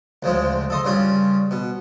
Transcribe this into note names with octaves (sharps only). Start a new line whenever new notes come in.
D2 C#3 F3 G#3
A4 D#5 C6
G2 C#3 C#4 F4
B2